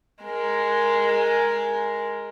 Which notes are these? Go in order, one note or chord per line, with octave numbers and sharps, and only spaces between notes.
G#3 A#4